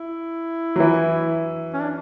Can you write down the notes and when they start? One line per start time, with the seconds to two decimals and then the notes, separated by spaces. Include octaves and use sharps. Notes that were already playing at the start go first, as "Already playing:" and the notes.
Already playing: E4
0.76 F#3
0.80 E3
1.74 C#4
1.81 D4